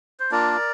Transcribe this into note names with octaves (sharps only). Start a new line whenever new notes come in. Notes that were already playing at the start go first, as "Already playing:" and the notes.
C5
A#3 D4 F4 A#4 D5